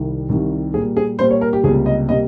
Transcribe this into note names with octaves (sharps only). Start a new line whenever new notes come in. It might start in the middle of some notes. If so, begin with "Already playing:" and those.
Already playing: C2 C3 D#3 G3
C2 C3 D#3 G3
A#2 G3 A#3 G#4
G#4
A#2 G3 A#3 C5
C#5
A#4
G4
C#2 C3 G3 A#3 G#4
D#5
C3 G3 A#3 D#5